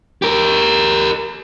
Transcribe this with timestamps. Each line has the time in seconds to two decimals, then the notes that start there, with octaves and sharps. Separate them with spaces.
0.22 G4 A#4